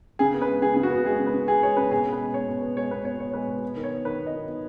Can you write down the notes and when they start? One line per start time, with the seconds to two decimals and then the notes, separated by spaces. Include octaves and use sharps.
0.19 C#3 G#4
0.34 B3
0.42 B4
0.48 G#3
0.62 C#3 G#4
0.75 C#3 G#4
0.83 F#4
0.91 B3
1.05 G#3 G#4
1.19 C#3
1.26 B4
1.34 C#3
1.48 B3 G#4
1.62 G#3 C#5
1.77 C#3 B4
1.91 B2 G#4
2.05 B3
2.13 B4
2.20 G#3
2.33 B2 C#5
2.48 B2
2.62 B3
2.76 G#3 C#5
2.90 B2 B4
3.05 B2 C#5
3.19 B3 C#5
3.33 G#3 B4
3.48 B2
3.63 B3
3.76 D#3
3.84 C#5
3.91 B3
4.05 D#3 B4
4.19 B3
4.27 D#5
4.34 D#3
4.48 B3